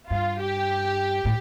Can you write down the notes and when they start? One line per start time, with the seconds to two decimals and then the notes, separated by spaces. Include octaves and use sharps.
0.10 G2 F4
0.40 G4
1.25 A2